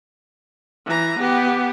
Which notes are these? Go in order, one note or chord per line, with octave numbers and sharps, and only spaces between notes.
E3 A#5
B3 G4